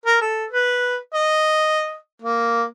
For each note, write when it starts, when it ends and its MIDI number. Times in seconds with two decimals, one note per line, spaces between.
0.06 0.19 70
0.21 0.45 69
0.50 0.97 71
1.14 1.97 75
2.22 2.65 58